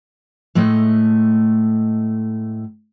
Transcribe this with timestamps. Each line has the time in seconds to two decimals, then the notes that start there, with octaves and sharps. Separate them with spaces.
0.55 A2 G#3 A3 D#5